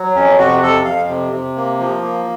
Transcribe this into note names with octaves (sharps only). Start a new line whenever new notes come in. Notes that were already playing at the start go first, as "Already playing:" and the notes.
Already playing: F#3
F2 C#4
C3 F#4
F2 A4
F2 F5
C3
C3
A#3
F3
A#3